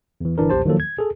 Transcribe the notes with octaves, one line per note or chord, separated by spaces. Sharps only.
E2 E3
G1 E3 D4 A#4
A#1 E2 G4 C5 A5
D#3 F3 F#3 A#3 A4
G#6
G#4 A4